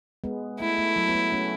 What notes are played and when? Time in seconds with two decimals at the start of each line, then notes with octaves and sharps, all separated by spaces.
0.24 G#3 B3
0.60 A3 E4
0.78 A3
0.96 F#3
1.08 B3
1.14 A3
1.32 A3 C#4